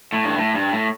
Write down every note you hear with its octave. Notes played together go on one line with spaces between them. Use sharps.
A2
G2
A2
G2
A2